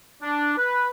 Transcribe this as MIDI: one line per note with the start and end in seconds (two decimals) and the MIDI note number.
0.22 0.53 62
0.57 0.88 71